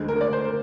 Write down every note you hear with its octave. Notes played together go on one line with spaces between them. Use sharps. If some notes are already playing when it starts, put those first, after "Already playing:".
Already playing: D2 D3 G#3
A#4
D5
C5
A#4